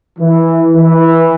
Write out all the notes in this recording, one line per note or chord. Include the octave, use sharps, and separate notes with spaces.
E3
E3